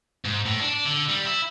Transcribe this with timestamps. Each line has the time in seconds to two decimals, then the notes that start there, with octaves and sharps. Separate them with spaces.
0.25 G#2
0.46 A2
0.60 D4
0.85 D3
1.09 G3
1.25 E4